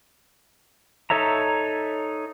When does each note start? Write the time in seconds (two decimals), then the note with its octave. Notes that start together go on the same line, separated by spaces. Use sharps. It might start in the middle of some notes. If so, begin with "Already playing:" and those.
1.10 D#4 A4 C#5 E5 A#5